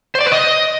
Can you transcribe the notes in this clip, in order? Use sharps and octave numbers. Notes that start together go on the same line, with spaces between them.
C5
D5
B4
D#5